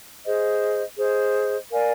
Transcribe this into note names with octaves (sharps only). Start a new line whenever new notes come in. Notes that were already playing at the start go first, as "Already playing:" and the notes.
G#4 C5 D#5
G#4 C5 D#5
A#4 D5 F5 G#5